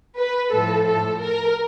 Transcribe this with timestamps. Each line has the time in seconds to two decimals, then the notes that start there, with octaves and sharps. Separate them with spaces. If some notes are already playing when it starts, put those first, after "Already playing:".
0.17 B4
0.51 A2 F3 A4
0.86 A4
1.20 A#4